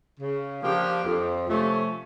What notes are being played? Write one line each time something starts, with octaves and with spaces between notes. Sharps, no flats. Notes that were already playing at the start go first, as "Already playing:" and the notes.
C#3
F3 A#3 D4 G4
F2
C3 F3 A3 C#4